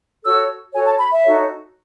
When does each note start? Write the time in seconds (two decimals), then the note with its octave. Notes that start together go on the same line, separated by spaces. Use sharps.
0.24 F#4 A4 C#5 E6
0.74 F#4 A4 C#5 G#5
0.86 A5
0.98 B5
1.11 E5
1.23 D#4 F#4 A4 C#5